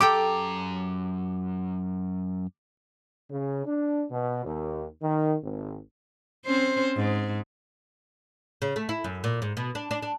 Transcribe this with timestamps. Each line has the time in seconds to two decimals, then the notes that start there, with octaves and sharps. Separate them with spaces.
0.01 F#2 G4 A4 G5 A#5 D6
3.30 C#3
3.66 D4
4.10 B2
4.45 D#2
5.02 D#3
5.43 G#1
6.46 C4 C#4 C5
6.97 G#2
8.62 C#3
8.76 A3
8.89 E4
9.04 F#2
9.24 A#2
9.42 G#2
9.57 B2
9.75 D4
9.91 D4
10.02 D4